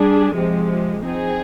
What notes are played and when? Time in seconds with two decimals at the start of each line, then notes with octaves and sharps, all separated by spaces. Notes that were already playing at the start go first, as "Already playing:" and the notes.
Already playing: G3 D4 G#4
0.35 C3 F3 G#3
1.03 F3 C4 D#4 G#4